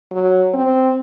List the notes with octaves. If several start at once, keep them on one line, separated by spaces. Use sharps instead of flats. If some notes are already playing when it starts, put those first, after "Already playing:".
F#3
C4